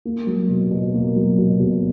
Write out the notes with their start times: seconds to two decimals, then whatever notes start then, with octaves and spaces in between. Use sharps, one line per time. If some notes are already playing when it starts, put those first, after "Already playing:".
0.05 A#3
0.27 F#3
0.49 B2
0.71 B2
0.94 A#3
1.16 F#3
1.38 B2
1.60 B2